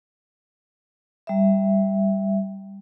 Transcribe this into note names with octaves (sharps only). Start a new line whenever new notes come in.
G3 E5